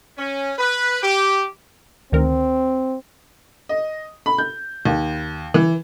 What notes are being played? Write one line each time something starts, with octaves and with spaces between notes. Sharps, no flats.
C#4
B4
G4
D2 D#3 C4 A#4
D#5
B5
G6
D#2
E3